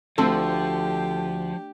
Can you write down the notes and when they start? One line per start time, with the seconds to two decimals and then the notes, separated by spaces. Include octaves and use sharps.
0.18 D2 D3 F3 C4 G4 A4